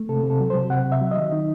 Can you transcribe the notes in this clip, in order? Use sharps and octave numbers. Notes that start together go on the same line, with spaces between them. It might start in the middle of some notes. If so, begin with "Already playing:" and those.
Already playing: A3
C3 A4
C3
A4
F#3
C5
C3
C3 F#5
C3
E5
F#3
D#5
D#3
D#4